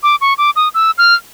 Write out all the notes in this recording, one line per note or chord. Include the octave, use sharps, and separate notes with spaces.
D6
C#6
D6
D#6
E6
F6